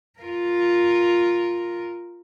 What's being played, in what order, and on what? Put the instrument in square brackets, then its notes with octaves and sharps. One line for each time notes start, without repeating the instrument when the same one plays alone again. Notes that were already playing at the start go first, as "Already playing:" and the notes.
[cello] F4 A#4